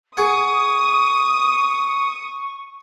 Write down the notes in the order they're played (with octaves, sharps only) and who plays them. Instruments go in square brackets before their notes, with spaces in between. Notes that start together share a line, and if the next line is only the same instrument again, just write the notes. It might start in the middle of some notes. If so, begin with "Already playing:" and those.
[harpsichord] G#4 F#5 [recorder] C#6 [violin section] D#6